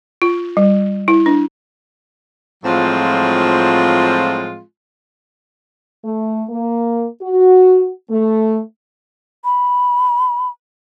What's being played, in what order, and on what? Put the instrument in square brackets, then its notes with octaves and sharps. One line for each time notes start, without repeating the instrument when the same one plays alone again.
[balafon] F4
G3
E4
D4
[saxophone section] A2 F3 F#3 G#3 C4 F4
[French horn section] A3
A#3
F#4
A3
[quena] B5